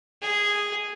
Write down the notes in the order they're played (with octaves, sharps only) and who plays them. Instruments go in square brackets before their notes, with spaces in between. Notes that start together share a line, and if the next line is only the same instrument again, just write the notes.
[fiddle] G#4